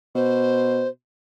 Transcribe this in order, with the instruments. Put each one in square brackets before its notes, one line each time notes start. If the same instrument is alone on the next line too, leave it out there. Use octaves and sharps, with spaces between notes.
[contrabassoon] B2 [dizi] C5